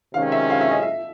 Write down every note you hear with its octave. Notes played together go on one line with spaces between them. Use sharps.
C3 D#3 G#3 C#4 F5
E5
F5
E5
D#5
E5